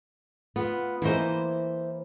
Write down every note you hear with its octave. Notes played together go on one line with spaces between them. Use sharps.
B3 F4
E3 A#3 E4 C5 D#5